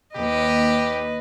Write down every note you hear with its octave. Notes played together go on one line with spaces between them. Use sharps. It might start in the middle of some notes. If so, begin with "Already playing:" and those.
D#2 G4 B4 D#5